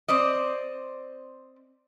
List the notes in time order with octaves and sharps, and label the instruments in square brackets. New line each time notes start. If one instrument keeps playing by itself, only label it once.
[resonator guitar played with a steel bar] C4 C5 D5 D#5